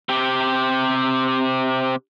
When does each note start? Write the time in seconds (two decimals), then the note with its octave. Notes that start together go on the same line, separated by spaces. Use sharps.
0.09 C3 G4